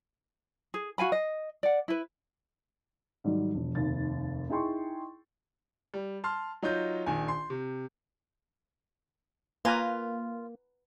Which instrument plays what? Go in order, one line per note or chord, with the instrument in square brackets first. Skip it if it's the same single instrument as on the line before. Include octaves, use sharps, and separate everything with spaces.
[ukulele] G#4
F#4 F5 G#5 B5
D#5
D5 F#5
E4 B4
[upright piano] G#2 D#3 F#3 G3
E1 F3
F1 D#2 A6
D#4 E4 G#4 G5 C6 C#6
[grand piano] G3
A5 C6 F6
F#3 D#4 F4 G6
A#1 D#3 G#5
C6
C3
[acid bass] A#3 [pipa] F4 [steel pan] B4 G#5 A#5